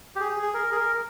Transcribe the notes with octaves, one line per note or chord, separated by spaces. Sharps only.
G4
G#4
G#4
A#4
G#4
A#4